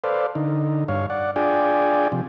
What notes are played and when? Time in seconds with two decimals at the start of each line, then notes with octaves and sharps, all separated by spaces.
0.04 A4 B4 C5 D5 F5
0.35 D3 D#4
0.88 G2 C#5 F5
1.10 D5 F#5
1.36 D4 F4 G#4 D5 G5 G#5
2.12 C3 F3